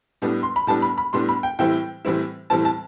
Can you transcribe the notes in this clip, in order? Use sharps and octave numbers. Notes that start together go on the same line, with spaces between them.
A2 G3 B3 D4
C6
B5
A2 G3 B3 D4 A5
B5
B5
A2 G3 B3 D4 C6
B5
G5
A2 E3 G3 C4 E4 G5
A2 E3 G3 C4 E4
A2 E3 G3 C4 E4 A5
A5